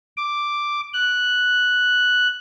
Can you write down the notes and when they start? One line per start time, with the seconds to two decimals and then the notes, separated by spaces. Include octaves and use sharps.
0.17 D6
0.94 F#6